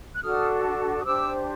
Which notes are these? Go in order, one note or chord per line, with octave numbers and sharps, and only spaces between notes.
F#6
D4 F#4 A4 D#6 F6
D#6
D4 G4 C5 D6 E6